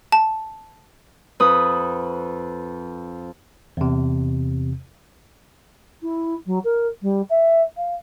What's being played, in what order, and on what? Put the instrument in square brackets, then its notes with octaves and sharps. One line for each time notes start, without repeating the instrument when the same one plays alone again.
[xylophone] A5
[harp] F2 B4 D#6
[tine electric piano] E2 C3
[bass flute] E4
F#3
A#4
G3
E5
F5